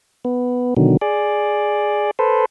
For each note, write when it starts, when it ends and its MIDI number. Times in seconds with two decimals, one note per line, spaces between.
0.25 0.74 59
0.77 0.97 47
0.77 0.97 50
0.77 0.97 51
0.77 0.97 54
1.01 2.11 68
1.01 2.11 74
2.19 2.45 69
2.19 2.45 71
2.19 2.45 72